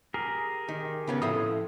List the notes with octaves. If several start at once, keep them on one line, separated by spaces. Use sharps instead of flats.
G4 G#4 A#4
D#3
C#3 B3 C#4
A2 F3 A3 D#6